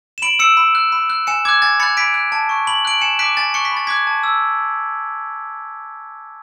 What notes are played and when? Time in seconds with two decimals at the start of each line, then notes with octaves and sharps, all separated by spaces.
0.18 E7
0.22 B5 D7 F#7
0.39 E6 C#7 E7
0.57 B5
0.75 F#6
0.92 B5
1.10 F#6
1.27 G#5 C#7 E7
1.45 D6 F#6 G#6
1.62 G#5 A6
1.80 B5 F#6 A6 C#7
1.97 B5 B6 D7
2.14 F#6
2.32 A5
2.49 C#6 F#6
2.67 B5 F#7
2.85 F#6 D7 F#7
3.01 G#5 C#7 E7
3.19 D6 F#6 B6 D7
3.37 G#5 A6
3.54 C#6 F#6 C#7
3.65 B6
3.72 B5 A6
3.87 D6 F#6 G#6 B6
4.07 A5
4.23 E6